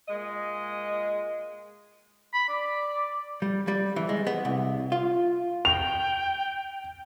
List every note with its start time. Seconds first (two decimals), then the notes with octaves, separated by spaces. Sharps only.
0.08 A#2 G#3 D#5
2.34 B5
2.49 D5
3.42 G3
3.68 G3
3.96 E3
4.09 G#3
4.27 B3
4.45 C2
4.92 F4
5.65 G5 F7